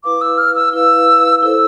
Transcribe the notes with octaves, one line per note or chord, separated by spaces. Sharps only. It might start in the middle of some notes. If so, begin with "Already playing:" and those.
E4 B4 F5 D6
E6
F6
E6
E4 B4 F5 E6
E4 A4 C5 E6